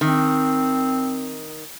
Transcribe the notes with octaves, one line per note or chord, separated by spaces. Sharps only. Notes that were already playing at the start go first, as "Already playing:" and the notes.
D#3 C4